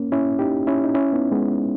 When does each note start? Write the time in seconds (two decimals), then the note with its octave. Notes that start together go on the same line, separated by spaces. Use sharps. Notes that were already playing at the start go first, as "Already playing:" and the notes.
Already playing: A#3 C#4
0.12 C#4 E4
0.39 D#4 G4
0.67 C#4 E4
0.85 D#4
0.95 C#4 E4
1.13 B3 D#4
1.32 G#3 B3